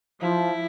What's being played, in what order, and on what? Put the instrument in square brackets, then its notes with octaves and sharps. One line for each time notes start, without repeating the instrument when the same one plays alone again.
[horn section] F3 [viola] E4